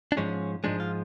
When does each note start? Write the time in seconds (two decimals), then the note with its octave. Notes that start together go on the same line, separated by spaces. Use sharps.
0.12 D4
0.17 G#2 F3 G#3 C#4
0.64 G#2 F3 G#3 D4
0.80 F4